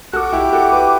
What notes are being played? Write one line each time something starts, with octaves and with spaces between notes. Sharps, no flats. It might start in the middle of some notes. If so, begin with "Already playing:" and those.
F#4 A4 D6 F#6
E4 G4
G4
F#4 A4
G4 B4